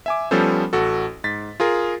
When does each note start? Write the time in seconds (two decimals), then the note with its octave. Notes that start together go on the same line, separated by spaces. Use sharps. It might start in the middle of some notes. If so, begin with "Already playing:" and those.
0.06 E5 G#5 D6
0.31 F3 G3 B3 C#4 A4 C5
0.73 A1 F#4 A4
1.24 G#2 A6 B6
1.60 F4 G#4 A#4